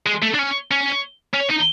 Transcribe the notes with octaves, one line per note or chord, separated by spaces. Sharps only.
G#3
A3
D4
C#4
C#4
C#4
D#4